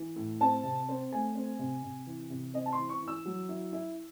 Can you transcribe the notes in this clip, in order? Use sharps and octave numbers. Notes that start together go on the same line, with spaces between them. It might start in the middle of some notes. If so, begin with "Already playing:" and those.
Already playing: E3
A2
C4 A5
C3
C4
A3 G#5
C4
C3
C3
E3
C3
C4 D#5
A5
C6
E3
C#6
E3
E6
F#3
E4
E4